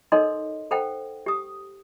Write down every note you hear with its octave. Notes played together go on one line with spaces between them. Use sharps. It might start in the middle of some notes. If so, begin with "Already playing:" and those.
D#4 A4 A#4 C#5 D#5 C6
A4 C5 F#5 G5
G4 D#6